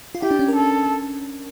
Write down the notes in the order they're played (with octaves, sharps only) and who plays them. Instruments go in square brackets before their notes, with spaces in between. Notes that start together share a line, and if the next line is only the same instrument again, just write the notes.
[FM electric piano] F4
[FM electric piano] E4 [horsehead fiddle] G4
[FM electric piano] D4
C#4
A#4
[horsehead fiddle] A4